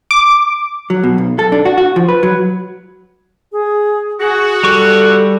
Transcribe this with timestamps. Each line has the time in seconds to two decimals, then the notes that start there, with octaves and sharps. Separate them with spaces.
0.11 D6
0.90 F#3
1.03 B2
1.18 B1
1.39 A4
1.52 D4
1.65 F#4
1.78 F#4
1.96 F3
2.08 B4
2.23 F#3
3.52 G#4
4.20 F#4 G#4
4.63 G3 G4 A4 C#6